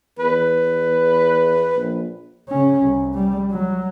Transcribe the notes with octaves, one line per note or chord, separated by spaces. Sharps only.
E2 B4
A#1
C#3 C#4
C2
G3
F#3